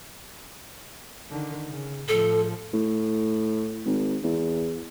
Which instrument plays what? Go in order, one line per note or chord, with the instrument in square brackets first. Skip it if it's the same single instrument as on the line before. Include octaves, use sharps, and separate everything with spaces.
[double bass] D3 D#3
C#3
[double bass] A2 F3 [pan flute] A4
[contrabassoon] A2
G#1
E2